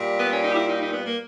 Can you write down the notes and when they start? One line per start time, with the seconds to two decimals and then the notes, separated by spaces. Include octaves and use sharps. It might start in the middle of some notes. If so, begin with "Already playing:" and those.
Already playing: A#2 G3
0.18 B3
0.31 C#4
0.43 D#4
0.51 G4
0.55 E4
0.67 D#4
0.80 D#4
0.93 B3
1.05 A#3